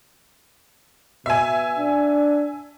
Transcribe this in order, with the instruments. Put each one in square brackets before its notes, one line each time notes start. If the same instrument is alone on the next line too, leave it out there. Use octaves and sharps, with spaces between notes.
[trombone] B2 [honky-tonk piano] E5 G#5
[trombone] D4